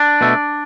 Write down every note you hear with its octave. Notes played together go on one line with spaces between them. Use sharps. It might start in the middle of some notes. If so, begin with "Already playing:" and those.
Already playing: D4
B2 A3